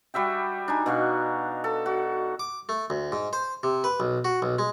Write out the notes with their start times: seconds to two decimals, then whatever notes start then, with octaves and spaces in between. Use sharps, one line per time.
0.14 G3 F#4 E5 G5
0.68 D4 D#4 G#5
0.86 B2 F#4 F5
1.64 A4
1.86 F#4
2.40 D6
2.69 A3
2.90 D2
3.12 G#2
3.33 C5
3.63 C3
3.84 B4
4.00 B1
4.25 F#4
4.42 B1
4.59 G#3